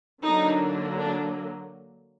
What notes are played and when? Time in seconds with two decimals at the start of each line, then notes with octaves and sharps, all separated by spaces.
0.22 D3 F#3 A#3 D4 D#4
0.98 D4